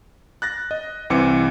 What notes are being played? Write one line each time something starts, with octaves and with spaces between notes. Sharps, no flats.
F#6 A6 A#6
D#5
C2 E3 C4 D6 C#7